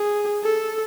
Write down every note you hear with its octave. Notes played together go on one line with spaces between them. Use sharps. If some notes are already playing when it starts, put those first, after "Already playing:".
Already playing: G#4
A4